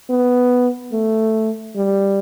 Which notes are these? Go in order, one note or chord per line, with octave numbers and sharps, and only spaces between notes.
B3
A3
G3